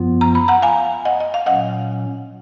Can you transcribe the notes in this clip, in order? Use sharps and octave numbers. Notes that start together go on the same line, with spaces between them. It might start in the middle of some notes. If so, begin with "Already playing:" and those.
Already playing: F#2 F3 B3 F4
A#5
B5
F#5 A#5
F5 G#5
D#5 F#5
D#5
F5
A#2 F#3 C#4 D#5 F#5